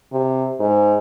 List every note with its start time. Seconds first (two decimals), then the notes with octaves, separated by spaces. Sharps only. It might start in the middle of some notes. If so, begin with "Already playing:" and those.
0.12 C3
0.60 G#2